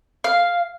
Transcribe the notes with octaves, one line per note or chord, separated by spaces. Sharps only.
F5